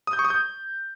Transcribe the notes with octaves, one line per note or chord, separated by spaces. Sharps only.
D#6
G6
C#6
D#6
G6